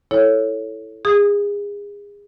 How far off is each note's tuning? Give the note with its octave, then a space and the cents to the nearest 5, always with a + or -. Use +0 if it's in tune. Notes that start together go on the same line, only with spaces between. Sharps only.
E4 +0 A4 +0 C#5 +0
G#4 -30 D#6 +0